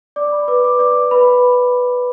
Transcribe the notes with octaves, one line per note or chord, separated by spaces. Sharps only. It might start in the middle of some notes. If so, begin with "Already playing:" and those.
D5 D6
B5
B4 D6
D6
D5 D6
B4 B5